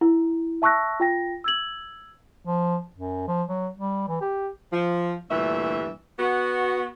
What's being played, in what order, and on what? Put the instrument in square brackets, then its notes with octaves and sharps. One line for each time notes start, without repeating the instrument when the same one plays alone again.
[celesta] E4
E5 A5 C#6 E6 F#6 A#6
F4 G5 A#6
E6 G#6 F#7
[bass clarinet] F3
F#2
F3
F#3
G3
E3
G4
[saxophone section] F3
D2 G2 A#2 E3 A3 E5
B3 F#4